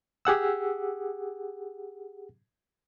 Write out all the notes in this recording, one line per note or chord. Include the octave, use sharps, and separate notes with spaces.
G4 G#4 F#5 E6